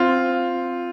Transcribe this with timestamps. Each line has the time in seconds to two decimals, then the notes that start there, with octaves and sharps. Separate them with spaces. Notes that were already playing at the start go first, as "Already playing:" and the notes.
Already playing: C4 F4